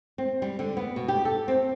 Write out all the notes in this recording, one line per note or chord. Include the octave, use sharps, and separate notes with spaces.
C4
G3
D3
B3
B2
G4
A4
C4